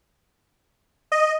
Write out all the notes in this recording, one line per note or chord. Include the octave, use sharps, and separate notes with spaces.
D#5